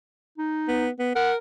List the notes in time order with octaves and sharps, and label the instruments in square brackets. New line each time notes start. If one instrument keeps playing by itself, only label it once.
[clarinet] D#4
[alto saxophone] B3
B3
[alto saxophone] A#4 [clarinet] F#5